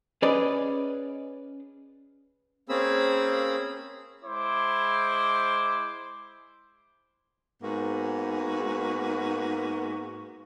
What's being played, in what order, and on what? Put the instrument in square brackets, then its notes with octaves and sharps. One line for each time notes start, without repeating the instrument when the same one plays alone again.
[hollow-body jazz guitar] C#4 G#4 B4 D5 D#5
[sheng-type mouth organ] A#3 C4 C#4 G#4 B5 E6
[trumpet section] G#3 E4 C5 D6
[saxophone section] G#2 A#3 B3 F#4